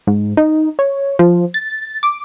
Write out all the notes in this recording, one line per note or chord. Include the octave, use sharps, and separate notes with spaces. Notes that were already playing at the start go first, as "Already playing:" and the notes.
G#2
D#4
C#5
F3
A6
D6